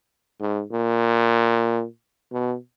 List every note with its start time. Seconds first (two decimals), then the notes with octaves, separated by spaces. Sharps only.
0.40 G#2
0.71 A#2
2.32 B2